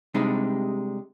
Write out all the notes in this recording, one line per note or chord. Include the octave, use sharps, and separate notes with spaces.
C3 G3 G#3 D4 D#4